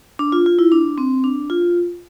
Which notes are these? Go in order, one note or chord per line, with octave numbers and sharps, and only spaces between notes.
D4
F4
F4
E4
D4
C4
D4
F4